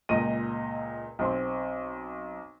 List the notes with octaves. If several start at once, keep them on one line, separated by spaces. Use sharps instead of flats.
C#2 A#2 D#5 D#7
B1 C4 C6